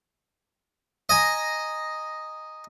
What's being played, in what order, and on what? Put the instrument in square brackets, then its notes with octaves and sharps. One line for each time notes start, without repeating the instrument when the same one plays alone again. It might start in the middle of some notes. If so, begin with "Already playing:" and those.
[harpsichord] D#5 G#5 A#5